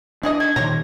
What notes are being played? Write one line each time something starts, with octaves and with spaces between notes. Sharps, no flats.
E3 D4 G#4 D#5
D#3 G#6
A#2 D#3 C5 C#5 A#5